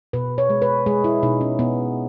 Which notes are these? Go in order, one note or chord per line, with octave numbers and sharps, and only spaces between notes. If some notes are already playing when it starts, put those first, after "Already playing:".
B2 B4
C#5
G#3
B4
G#3 G#4
E4
B2 D#4
C#4
B2 B3